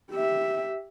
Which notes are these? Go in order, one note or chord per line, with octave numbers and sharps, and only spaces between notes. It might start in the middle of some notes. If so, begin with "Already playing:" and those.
G4 E5